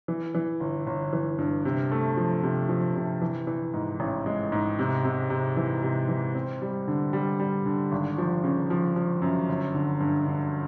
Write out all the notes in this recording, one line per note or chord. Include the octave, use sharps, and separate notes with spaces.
E3
E3
G1
G1
E3
G2
C3
A3
F3
C3
F3
C3
E3
E3
G#2
A1
G#3
G#2
C3
C3
C3
E3
C3
E3
C4
G3
D3
G3
G3
D3
G#1
F3
C#3
F3
F3
F#2
G1
D3
G2
D3